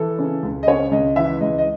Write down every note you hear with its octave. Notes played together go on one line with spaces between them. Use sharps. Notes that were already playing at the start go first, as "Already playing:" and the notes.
Already playing: E3 A4
C#3
C#2
D#5
C#3 C#5
C#2 D#5
E3 E5
C#2 D#5
D#5